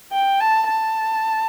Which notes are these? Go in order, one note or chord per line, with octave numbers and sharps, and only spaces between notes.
G5
A5
A5